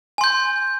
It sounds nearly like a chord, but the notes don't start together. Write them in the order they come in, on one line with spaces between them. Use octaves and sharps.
G#5 C6 G6